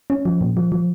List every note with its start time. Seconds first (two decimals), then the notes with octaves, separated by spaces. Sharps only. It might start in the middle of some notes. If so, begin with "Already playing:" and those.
0.10 C#4
0.25 F3
0.41 A#2
0.57 F3
0.72 F3